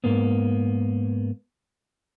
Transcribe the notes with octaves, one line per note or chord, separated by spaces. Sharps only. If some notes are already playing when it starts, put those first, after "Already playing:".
G#2 A#3 B3